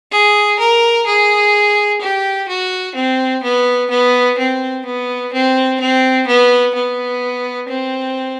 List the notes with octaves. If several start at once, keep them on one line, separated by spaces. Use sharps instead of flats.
G#4
A#4
G#4
G4
F#4
C4
B3
B3
C4
B3
C4
C4
B3
B3
C4